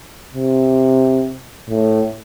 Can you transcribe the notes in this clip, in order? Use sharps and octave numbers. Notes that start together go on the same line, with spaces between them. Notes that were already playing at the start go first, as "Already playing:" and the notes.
C3
A2